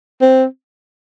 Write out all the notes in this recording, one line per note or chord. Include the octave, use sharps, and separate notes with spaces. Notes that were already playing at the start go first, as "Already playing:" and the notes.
C4